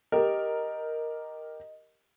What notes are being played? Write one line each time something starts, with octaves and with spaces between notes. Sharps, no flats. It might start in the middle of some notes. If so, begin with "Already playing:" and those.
G4 A#4 D#5